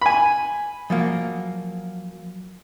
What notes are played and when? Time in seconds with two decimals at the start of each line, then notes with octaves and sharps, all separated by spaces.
0.02 G#5 B5
0.90 F3 F#3 A#3